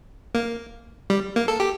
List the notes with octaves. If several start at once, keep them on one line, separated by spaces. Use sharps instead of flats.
A#3
G3
A#3
A4
G4